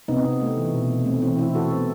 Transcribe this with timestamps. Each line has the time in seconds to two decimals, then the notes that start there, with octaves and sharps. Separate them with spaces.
0.08 C3 B3 D#4
0.25 C3 C4
0.41 A3
0.57 E3
0.74 B2
0.90 B2
1.06 A3 C4
1.22 E3 C4 E4
1.38 E3 C4 E4
1.55 E3 F#4 A4
1.71 B3 C4